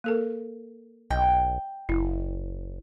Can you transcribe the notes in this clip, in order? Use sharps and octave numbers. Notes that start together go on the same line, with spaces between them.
A#3 A4 A#4
B1 D#5 G5
F#1 E4